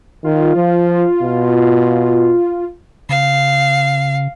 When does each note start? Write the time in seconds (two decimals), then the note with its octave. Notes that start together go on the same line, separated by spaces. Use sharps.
0.24 D#3 F4
0.56 F3
1.23 B2
3.09 C#3 F5